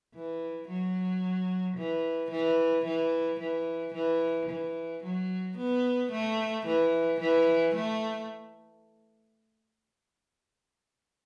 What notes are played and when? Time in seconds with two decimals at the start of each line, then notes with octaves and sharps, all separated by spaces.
0.14 E3
0.68 F#3
1.77 E3
2.31 E3
2.85 E3
3.40 E3
3.94 E3
4.49 E3
5.04 F#3
5.57 B3
6.12 A3
6.66 E3
7.20 E3
7.75 A3